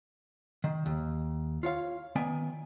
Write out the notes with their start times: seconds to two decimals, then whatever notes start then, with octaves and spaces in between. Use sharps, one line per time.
0.64 D#3
0.86 D#2
1.63 F4 C#5 F5
2.16 D#3 B3 D5 G#5